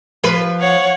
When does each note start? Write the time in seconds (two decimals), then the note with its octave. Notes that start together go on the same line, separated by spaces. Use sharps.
0.24 F3 B4
0.60 C#5 F5 F#5